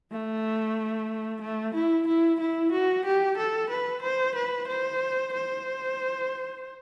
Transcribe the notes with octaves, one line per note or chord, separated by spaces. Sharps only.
A3
A3
E4
E4
E4
F#4
G4
A4
B4
C5
B4
C5
C5